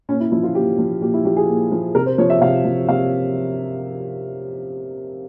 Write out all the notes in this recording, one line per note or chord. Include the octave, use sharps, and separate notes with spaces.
A#2 C#4
E4
F3 E4
F4
A#2 G4
F3
A#2 G4
E4
F3 G4
G#4
A#2
F3
C3 A#4
C5
F3 C#5
E5
C3 F5
F3
C3 F5